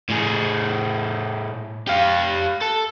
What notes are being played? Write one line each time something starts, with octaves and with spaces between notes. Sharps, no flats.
A2 G#4
G4 F5
A4